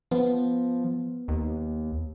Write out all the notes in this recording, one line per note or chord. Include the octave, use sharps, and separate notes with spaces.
F3 B3
D#2